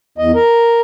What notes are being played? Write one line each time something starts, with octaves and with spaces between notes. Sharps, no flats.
E2 D#5
A#4